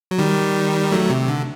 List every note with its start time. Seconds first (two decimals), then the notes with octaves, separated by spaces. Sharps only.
0.11 F#3
0.18 D#3 G3
0.92 F#3 A3
1.10 C3
1.28 D3